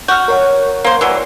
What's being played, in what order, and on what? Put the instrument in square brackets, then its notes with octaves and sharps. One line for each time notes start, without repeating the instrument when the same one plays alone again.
[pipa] F#4 [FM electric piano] F6 G6
[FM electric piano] A#4 C#5 F#5
[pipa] A#3 C5
E3 F#3 G3